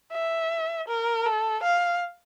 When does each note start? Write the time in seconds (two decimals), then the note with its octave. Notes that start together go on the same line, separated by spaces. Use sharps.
0.12 E5
0.88 A#4
1.26 A4
1.63 F5